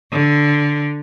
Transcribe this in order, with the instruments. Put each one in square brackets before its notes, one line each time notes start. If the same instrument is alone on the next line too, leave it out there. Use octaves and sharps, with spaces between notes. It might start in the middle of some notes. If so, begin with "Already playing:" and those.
[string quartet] D3